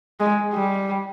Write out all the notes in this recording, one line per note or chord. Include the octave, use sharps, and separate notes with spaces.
G#3
G3